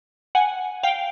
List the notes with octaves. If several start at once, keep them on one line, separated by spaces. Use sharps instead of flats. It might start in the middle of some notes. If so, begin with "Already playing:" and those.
F#5 G#5
F5 G5